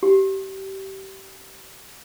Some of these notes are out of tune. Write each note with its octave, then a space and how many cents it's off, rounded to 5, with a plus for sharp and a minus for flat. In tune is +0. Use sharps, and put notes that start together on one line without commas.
G4 -25